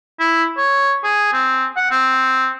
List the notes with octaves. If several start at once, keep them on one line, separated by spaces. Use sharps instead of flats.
E4
C#5
G#4
C4
F#5
C4